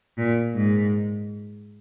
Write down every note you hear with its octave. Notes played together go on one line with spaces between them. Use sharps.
A#2
G#2